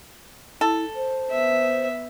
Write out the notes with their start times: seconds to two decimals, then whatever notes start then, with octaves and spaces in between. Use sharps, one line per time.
0.61 E4 A4
0.96 C5
1.31 B3 E5